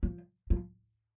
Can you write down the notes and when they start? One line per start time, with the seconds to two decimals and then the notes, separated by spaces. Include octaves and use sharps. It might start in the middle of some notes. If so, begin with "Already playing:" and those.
0.03 F3
0.50 F3